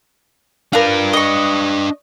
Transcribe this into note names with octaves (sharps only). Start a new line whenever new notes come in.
D4 F4 A#4 B4
D#5 C#6